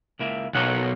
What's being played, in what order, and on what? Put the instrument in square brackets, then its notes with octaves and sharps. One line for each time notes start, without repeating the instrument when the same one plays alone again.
[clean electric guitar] C#2 A#3 E4
[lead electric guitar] B1 [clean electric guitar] A#4 C#5 F#5